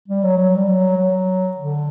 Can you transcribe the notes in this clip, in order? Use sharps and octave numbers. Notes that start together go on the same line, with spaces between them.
G3
F#3
F#3
G3
F#3
F#3
D3